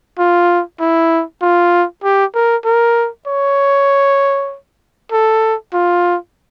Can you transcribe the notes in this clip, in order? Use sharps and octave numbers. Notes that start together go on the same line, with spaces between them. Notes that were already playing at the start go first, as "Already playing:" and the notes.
F4
E4
F4
G4
A#4
A#4
C#5
A4
F4